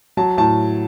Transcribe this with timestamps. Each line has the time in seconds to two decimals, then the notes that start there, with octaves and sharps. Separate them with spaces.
0.17 F#3 A5
0.38 A2 A5